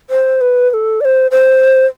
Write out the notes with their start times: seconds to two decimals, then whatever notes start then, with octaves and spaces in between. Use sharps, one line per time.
0.10 C5
0.41 B4
0.70 B4
0.74 A4
1.01 D5
1.05 C5
1.31 C5